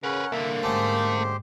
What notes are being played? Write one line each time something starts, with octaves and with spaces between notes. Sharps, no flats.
C#3 C#4 A#4 B4 F#5
C2 D3 A#3 E5
G#2 D3 A3 C#4 G4 C5